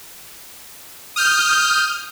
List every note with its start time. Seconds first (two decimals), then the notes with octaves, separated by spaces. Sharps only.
1.16 D#6 F6 G6